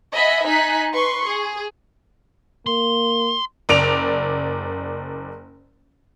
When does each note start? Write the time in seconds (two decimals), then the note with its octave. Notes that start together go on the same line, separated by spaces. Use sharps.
0.12 D#5 E5 F#5 G#5 B5
0.44 D#4 G#5 F#6 B6
0.92 B4 C6 C#6
1.27 G#4
2.66 A#3 C6
3.69 F#1 D5 D7 F7